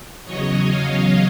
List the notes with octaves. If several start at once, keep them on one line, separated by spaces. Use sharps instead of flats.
E2 C#3 F#3 C#5 D#5
D#5 F5